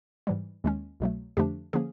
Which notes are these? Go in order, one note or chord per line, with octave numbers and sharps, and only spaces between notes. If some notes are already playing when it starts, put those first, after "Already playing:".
G#2 E3 G3
D#2 D#3 G#3 C#4
C2 B2 F#3 A3
F2 D3 F3 A3 D4 G4
D3 F3 A#3 C#4 G#4